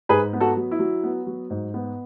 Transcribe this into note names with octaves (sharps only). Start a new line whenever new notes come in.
G#2 G#4 B4
B3
F#4 A4
F#3
E4
F#3
B3
F#3
G#2
B3